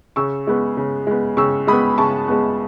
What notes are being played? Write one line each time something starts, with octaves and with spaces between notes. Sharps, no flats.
C#3 C#6 E6
G#3 B3
C#3
G#3 B3
C#3 C#6 E6
G#3 B3 B5 D#6
C#3 A5 C#6
G#3 B3